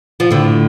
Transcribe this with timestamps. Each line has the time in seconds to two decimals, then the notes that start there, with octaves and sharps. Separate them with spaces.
0.20 F3
0.31 A2 D3